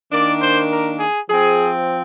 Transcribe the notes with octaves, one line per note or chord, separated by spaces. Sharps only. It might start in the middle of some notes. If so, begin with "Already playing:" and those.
D#3 A#3 D4 D5
C5
A#4
G#4
F3 C4 G#4